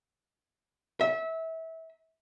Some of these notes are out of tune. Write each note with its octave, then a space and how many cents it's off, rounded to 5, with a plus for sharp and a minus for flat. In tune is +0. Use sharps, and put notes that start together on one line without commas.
E5 -25